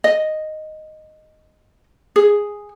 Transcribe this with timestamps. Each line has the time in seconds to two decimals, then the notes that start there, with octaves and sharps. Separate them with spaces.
0.04 D#5
2.16 G#4